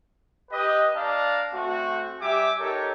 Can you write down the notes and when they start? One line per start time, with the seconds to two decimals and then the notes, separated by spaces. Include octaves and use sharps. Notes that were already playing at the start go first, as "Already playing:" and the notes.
0.51 G4 B4 D#5
0.95 D4 D5 F5 A5 A#5
1.54 A3 C4 F#4
2.20 G3 G4 E5 G#5 D6
2.59 D#4 G4 A4 A#4 C#5